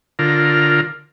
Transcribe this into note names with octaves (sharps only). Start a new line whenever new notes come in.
D3 F4 A#4